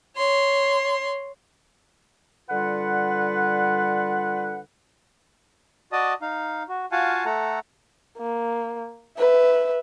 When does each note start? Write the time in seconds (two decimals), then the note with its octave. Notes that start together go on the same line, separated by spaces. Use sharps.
0.16 C#5 C6
2.50 D3 G3 F4 B4 F#5
5.92 F#4 D5 D#5 A5 D#6
6.22 D#4 F5
6.69 F#4
6.92 F4 F#4 F5 F#5 G#5 A5
7.25 A3 A4 F#5 A#5
8.18 A#3
9.18 B4 E5